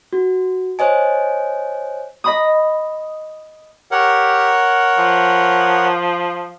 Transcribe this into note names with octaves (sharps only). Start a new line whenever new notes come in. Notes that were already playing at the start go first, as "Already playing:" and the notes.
F#4
C5 C#5 D#5 G#5
D#5 B5 D#6
G4 A#4 C#5 F#5
F3